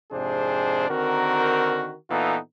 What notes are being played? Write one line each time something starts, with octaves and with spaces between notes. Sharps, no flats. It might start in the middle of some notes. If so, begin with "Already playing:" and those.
F2 G#2 C3 D4 G#4 C5
D3 D#3 C4 F#4 A#4
A#2 E3 B3 D#4 F4 A4